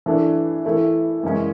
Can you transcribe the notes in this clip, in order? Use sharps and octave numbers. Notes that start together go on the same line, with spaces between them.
E3 A3 D4
E3 A3 E4
F#2 C#3 E3 G#3 C#4